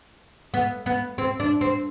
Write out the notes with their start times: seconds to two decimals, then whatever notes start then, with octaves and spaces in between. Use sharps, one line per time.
0.54 B3
0.86 B3
1.18 C4
1.40 D4
1.61 C4